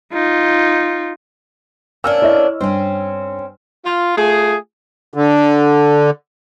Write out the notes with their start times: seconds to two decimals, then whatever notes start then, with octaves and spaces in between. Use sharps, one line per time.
0.13 D#4 F4
2.04 A#3 C#4 D4 E6 F6
2.22 E4 C#5 D#5
2.61 G2 C4 C#4
3.85 F4
4.17 A3 F4 G#4
5.14 D3